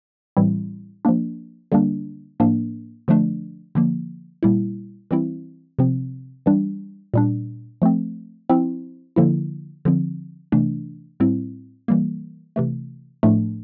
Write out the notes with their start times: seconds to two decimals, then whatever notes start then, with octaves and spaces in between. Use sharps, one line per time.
0.37 A2 E3 G3 C4 E4
1.05 F3 A#3 D4
1.72 D3 G3 A#3 D4
2.40 A2 F3 A#3 D4
3.08 D3 F3 A3 D4
3.75 D3 F3 A#3
4.43 A#2 G3 A#3 E4
5.11 E3 G3 C4 E4
5.79 C3 F3 C4
6.46 E3 G3 D4
7.14 A#2 G3 D4
7.82 F3 A3 C4
8.50 F3 C4 E4
9.16 D3 F3 A#3 E4
9.85 D3 F3 C4
10.52 C3 E3 A3 D4
11.20 A2 G3 C4 E4
11.88 E3 G3 A#3
12.56 C3 E3 A3
13.23 A2 F3 A3 D4